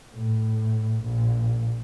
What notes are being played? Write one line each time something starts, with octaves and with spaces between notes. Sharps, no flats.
A2
A#1